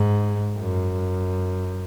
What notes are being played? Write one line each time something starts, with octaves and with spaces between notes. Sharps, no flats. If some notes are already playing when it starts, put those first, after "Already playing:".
Already playing: G#2
F#2